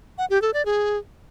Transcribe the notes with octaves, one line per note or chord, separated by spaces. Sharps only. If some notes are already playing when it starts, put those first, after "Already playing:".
F#5
G4
A4
D5
G#4